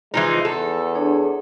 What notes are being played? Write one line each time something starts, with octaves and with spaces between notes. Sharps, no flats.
E3 F3 G#3 D#4
E2 A4
D4 G#4 C#5